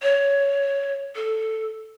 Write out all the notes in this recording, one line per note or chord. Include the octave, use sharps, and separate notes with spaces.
C#5
A4